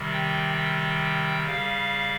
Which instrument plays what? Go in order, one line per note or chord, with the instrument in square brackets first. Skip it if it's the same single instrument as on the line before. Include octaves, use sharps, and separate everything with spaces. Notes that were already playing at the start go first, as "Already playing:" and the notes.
Already playing: [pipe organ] C3 D#3 G3
G5
G5
C#3 G3 F5